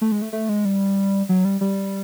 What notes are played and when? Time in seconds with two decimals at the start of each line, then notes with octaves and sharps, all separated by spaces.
0.01 A3
0.12 G#3
0.22 A3
0.33 A3
0.49 G#3
0.65 G3
1.29 F#3
1.45 G3
1.61 G3